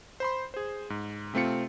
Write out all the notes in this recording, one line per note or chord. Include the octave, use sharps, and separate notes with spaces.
C5 B5 C6
G#4 C5
G#2
C3 A3 C4 F4 C#7